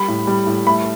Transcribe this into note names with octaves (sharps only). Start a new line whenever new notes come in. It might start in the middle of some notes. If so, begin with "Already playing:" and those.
Already playing: G3 B5
A2
G3
A2
A3 B5